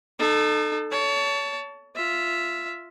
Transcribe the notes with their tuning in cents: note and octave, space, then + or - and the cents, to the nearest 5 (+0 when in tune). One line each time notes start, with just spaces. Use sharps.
D#4 -35 A4 +0
C#5 +30 A5 +0
F4 -5 E5 +0